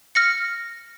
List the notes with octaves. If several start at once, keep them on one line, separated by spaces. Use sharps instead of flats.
F6 A#6 C#7